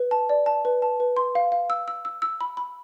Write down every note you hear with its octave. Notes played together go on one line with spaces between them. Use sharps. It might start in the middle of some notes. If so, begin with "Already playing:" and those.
Already playing: B4
A5
D5
A5
B4
A5
B4
C6
F5
F5
E6
E6
E6
E6
B5
B5